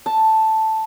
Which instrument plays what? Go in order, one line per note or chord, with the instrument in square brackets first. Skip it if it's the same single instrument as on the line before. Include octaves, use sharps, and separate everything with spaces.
[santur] A5